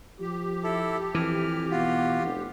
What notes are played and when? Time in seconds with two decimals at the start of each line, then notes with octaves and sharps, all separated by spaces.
0.20 F3 G4
0.64 E4 A4
1.15 F2 E3 F6
1.71 B2 F4 F#4
2.22 F1